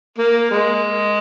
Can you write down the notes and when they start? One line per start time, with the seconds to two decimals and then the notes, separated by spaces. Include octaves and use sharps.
0.18 A#3
0.51 G#3